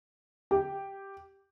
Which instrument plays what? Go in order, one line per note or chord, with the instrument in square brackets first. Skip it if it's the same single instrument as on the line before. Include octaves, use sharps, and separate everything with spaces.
[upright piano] G4